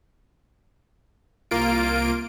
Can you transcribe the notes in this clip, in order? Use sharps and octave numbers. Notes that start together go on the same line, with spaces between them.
C2 A#3 F4 D7